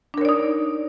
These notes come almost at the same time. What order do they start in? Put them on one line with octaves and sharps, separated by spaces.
D4 A#4 C#5 D5 D#4